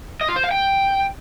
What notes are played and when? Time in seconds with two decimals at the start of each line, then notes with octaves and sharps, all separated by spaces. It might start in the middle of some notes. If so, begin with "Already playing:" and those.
0.21 D#5
0.29 F4
0.36 C5
0.44 F5
0.51 G5